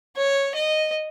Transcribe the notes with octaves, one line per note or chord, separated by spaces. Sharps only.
C#5
D#5